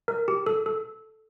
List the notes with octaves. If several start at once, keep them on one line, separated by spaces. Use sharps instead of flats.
A#4
G4
A4
A4